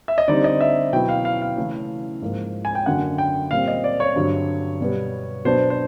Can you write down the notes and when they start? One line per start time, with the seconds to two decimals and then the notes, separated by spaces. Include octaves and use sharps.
0.08 E5
0.18 D#5
0.28 D3 G3 C4 D#4 D5
0.44 D#5
0.61 E5
0.93 B2 F#3 B3 E4 G5
1.09 F5
1.25 F5
1.42 F5
1.57 C#3 E3 A3 C#4 E4
2.22 G#2 F3 A#3
2.65 G#5
2.75 G5
2.86 F#2 D3 F#3 A#3 F#5
3.18 G5
3.51 A#2 G3 C4 F5
3.68 D#5
3.84 D5
4.00 C#5
4.16 G2 D3 F#3
4.81 B2 G3 B3
5.45 B2 F#3 B3 D4 C5
5.70 C5